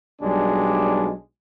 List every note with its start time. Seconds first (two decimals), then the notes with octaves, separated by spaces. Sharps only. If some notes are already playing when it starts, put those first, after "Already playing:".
0.22 B1 G3 G#3 D4